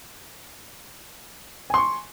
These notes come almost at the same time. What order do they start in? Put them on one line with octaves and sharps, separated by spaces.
G#5 C6 C#6